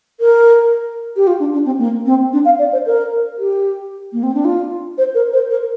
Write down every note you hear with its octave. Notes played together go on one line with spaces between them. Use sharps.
A#4
G4
F4
D4
D4
C4
A#3
C4
D4
F5
D5
C5
A#4
G4
A#3
C4
D4
F4
C5
A#4
C5
A#4